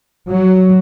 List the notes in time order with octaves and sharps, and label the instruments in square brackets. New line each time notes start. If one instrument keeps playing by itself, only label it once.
[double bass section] F#3